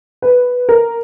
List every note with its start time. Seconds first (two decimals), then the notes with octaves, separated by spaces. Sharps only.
0.22 B4
0.69 A#4